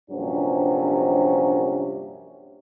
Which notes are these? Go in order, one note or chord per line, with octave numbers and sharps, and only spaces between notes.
A#1 G2 C3 F#3 C#4